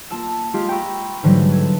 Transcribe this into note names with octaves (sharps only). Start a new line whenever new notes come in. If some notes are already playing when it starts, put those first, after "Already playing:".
A#3 F4 A5 E6
G#3 F4 G4
F#5 G5 A#5 B5 C#6 E6
G#2 D3 E3 F#3 G3 A3
A4 G#6